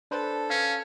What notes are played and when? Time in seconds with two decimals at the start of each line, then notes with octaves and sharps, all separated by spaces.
0.11 D4 A4 B4 C5
0.50 C#4 F5